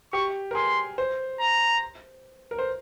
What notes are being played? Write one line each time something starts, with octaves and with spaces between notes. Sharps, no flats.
G4 C#6
A#4
G#4 C6
C5
A#5
A#4
C5